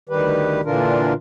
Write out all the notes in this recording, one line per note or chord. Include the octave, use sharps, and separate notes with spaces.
D2 D#3 G3 G4 B4
A#2 D3 E3 D4 F4 A#4